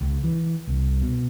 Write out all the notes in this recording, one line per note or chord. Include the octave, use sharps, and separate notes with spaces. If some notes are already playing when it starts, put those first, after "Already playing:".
C#2
E3
C2
B2